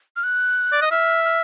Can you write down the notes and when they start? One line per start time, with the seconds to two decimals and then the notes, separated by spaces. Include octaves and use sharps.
0.16 F6
0.24 F#6
0.72 D5
0.82 D#5
0.91 E5 F6
1.25 F6